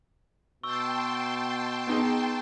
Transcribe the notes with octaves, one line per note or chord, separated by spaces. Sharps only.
B2 G5 A5 C6 C#6 E6
B3 D#4 G#4